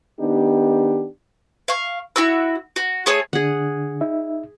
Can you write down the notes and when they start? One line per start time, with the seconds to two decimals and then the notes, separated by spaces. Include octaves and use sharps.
0.20 D#3 B3 D4 D#4 G4
1.68 F5 C#6
2.16 E4 F#4 E6
2.76 F#4
3.06 A3 G#4 C#5 D#6
3.33 D3 D4 G#4 F#5
4.01 D#4 E5